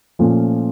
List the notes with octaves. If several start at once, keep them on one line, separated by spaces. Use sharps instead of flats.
A#2 F3 A3 C#4 F4